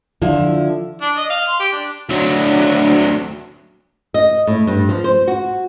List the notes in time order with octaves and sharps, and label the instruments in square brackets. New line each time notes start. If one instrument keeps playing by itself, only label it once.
[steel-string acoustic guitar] D3 F3 E4
[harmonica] D4
D#5
F5
C6
G4
D4
[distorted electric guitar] D2 F#3
[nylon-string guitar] D#5
A2
G2
F3
C5
F#4